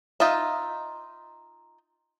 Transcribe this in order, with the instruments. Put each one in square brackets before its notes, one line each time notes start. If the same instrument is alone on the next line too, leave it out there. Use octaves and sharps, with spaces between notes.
[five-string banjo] D#4 F4 D#5 E5